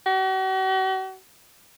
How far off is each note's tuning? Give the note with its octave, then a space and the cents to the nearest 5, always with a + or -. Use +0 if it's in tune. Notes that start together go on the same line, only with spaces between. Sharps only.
F#4 +45